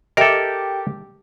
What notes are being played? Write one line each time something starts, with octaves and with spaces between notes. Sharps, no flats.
G4 A4 A#4 D#5 E5 G5